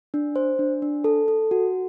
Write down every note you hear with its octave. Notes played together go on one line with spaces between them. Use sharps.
D4
C5
D4
D4
A4
A4
F#4